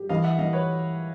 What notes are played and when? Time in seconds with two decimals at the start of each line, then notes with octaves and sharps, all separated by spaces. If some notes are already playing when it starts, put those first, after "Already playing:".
Already playing: G4
0.09 E3 D#5 F5
0.24 E5 F#5
0.38 E3 D#5 F5
0.53 B4 C#5